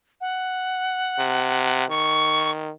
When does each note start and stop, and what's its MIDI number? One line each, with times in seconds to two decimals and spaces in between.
0.21 1.88 78
1.19 1.84 48
1.90 2.71 51
1.90 2.51 85